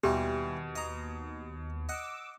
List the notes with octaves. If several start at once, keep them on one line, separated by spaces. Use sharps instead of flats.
D#2 B2 E3 G3 G4
D#5 A#5
D#5 F#5 D6 E6